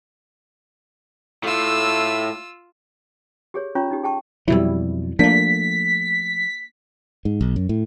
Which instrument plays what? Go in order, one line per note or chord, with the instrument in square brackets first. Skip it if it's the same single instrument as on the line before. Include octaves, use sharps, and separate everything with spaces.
[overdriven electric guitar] A2 [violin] F4 E6
[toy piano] G4 G#4 C#5
C#4 F4 C#5 A#5 C#6
D#4 G4
G#4 G5 A5 C#6
[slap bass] F2 B2 F#3 [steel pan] G3 E4
[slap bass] F3 A3 [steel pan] A#3 D4 [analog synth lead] B6
[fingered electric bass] G#2
B1
F#2
A2